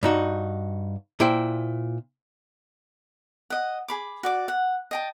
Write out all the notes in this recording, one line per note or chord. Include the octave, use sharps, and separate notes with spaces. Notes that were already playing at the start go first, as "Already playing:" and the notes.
G2 D#4 F#4
A#2 E4 C5 G5
D#5 F#5
G#4 B5 D6
F#4 D5 D6
F#5
D#5 G5 A5